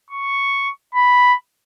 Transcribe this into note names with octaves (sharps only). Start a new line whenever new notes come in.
C#6
B5